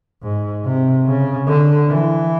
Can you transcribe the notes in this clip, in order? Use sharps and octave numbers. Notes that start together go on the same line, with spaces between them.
G#2
C3
C#3
D3
E3